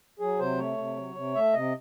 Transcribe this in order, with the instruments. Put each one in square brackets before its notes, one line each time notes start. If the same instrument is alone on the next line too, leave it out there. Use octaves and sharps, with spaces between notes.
[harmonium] F#3 G#4
C3 C5
A3 C#5
C3
F#3
C3
A3 E5
C3 D#5